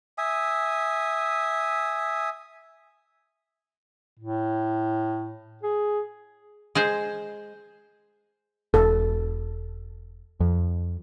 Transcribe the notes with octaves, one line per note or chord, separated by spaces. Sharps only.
E5 G#5 D#6
A2
G#4
G#3 G#4 C5
E1 A4
F2